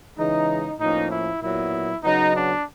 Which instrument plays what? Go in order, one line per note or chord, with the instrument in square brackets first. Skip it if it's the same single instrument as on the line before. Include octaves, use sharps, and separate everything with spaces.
[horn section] C#3 E3 G#3 D#4
A2 F3 A#3 C#4 D#4
E4
A#2 F#3 B3 E4
C#3 F#3 B3 D#4
D4